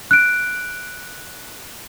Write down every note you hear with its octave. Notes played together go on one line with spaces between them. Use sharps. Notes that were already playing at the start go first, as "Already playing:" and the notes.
F#6 D7